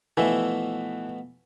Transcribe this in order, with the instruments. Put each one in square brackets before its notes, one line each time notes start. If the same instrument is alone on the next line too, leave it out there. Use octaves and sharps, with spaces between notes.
[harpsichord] B2 F3 A3 [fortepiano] E3